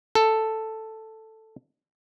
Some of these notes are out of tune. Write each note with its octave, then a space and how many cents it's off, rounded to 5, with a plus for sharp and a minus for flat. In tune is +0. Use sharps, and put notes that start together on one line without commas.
A4 +5